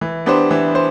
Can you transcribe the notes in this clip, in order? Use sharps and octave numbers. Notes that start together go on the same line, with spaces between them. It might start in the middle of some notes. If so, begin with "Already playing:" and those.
E3
B3 D4 G4 C5
E3
C5